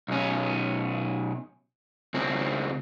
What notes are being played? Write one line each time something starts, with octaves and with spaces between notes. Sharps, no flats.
B1 C#4
C#2 C4